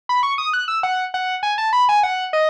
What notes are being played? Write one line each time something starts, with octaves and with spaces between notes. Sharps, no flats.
B5
C#6
D#6
F#6
E6
F#5
F#5
G#5
A5
B5
G#5
F#5
D#5